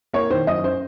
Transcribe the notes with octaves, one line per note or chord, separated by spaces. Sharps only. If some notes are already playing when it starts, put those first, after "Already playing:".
A#3 C#5
D#3 C5
F#2 D#5
C#4 C5